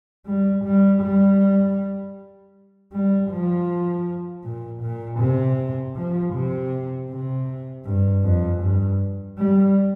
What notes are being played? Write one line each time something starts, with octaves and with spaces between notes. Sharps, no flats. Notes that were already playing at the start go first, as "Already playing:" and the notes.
G3
G3
G3
G3
F3
A#2
A#2
C3
F3
C3
C3
G2
F2
G2
G3